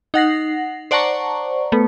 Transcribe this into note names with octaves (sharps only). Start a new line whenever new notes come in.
D#4 F#5 A#6 C7
C5 D5 F#5 A5 A#5 C#6
A3 B3